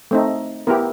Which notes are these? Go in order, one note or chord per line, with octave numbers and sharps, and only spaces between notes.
A3 C4 D#4
B3 E4 G4 A#4